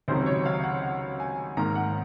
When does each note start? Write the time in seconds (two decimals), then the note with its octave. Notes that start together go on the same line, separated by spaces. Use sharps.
0.08 C#2 C3 D#3 F#3 C5
0.26 C#5
0.45 F5
0.63 F#5
0.82 F#5
1.20 G#5
1.57 G#2 D#3 A#3 A#5
1.75 F#5